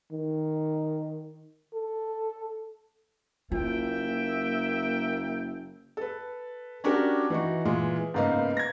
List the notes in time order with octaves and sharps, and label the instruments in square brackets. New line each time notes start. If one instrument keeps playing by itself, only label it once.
[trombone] D#3
A4
[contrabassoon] F#1 [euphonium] A#3 [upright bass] F4 [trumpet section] E5 G5
[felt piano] A4 B4
C#4 D4 F#4 G4 A#4
E3 D#4 F#4
A#2 E3 G#3
G#2 C#3 A#3 B3 D#4
G#6 A#6